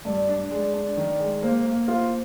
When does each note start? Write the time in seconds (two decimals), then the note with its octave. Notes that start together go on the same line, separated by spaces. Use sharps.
0.05 G2 D5
0.29 D4
0.51 G#3
0.73 D4
0.97 D#3
1.20 G#3
1.42 A#3 C5
1.65 A#3
1.88 F4